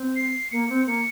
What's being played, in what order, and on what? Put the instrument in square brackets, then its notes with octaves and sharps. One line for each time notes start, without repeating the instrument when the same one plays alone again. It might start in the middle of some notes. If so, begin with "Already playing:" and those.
Already playing: [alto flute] C4
[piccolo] C7
[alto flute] A#3 [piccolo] C#7
[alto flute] C4
[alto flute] A#3 [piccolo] C#7